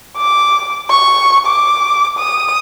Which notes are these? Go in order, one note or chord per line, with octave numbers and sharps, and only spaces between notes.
D6
C#6
D6
D#6